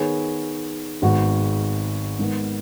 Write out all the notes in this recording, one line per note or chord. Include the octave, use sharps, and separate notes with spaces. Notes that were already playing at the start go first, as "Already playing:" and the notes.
Already playing: D#3 B3 G#4 C#5
G#1 G#2 G#3 B3 F#4
G#2 D#3 B3